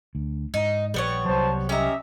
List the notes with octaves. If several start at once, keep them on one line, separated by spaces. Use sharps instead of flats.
D2
G#2 D#4
A#1 G3 B3 C#5
C2 F#3 C5 A5
C#4 G4 D#5 E5 A#5